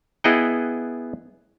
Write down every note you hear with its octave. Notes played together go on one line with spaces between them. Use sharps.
B3 E4 G#4 D#5 F#5 G5